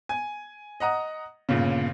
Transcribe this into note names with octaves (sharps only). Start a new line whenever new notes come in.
G#5
D#5 F#5 A#5 D#6
G1 A#2 C#3